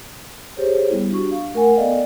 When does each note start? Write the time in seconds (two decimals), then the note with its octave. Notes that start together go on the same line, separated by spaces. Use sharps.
0.57 G4 G#4 C5 C#5
0.90 G3 B3 E4
1.12 D4 F#4 G4 C#6
1.31 F5
1.54 A3 A#4 F#5 G#5
1.76 B3 A4 D5 D#5 F5 G5